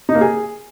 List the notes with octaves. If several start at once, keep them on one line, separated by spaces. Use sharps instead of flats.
D#4
A#3
G#4